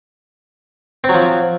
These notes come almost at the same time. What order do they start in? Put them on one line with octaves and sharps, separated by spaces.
C4 F#3 F3